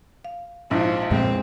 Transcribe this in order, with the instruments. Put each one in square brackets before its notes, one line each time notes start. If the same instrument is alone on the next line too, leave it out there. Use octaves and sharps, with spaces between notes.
[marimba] F5
[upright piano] A#1 G#2 [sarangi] F3 [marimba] E4
[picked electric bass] F2 A#2 G#3 [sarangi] C4